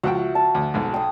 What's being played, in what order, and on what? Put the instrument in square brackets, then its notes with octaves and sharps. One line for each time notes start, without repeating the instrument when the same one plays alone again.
[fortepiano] C#2 F3 G5 [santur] F#4 E5
[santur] A5
[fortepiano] D2
B1 G#2
[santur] G5 D#6